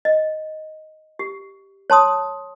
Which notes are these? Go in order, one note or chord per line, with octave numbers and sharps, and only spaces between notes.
D#5
G4
C#5 A5 C6 D#6